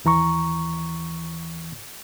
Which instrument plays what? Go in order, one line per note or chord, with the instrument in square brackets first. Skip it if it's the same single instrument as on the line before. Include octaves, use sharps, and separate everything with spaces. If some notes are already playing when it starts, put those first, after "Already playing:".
[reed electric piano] D#2 E3 A#5 C#6